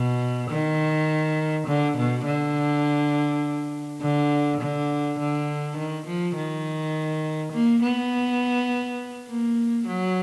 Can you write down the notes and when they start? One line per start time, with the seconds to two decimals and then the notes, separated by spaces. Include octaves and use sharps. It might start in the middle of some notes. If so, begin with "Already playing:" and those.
Already playing: B2
0.50 D#3
1.67 D3
1.97 B2
2.25 D3
4.01 D3
4.61 D3
5.19 D3
5.77 D#3
6.06 F3
6.36 D#3
7.53 A#3
7.83 B3
9.29 A#3
9.87 F#3